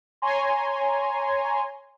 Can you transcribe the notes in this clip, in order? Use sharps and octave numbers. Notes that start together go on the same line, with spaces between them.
C#5 G#5 A#5 C6